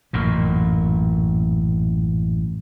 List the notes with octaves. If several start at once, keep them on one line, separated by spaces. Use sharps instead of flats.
A1 F#2 A#2